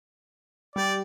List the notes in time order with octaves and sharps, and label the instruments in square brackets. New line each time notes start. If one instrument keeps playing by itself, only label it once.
[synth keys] G3 G4 [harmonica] D5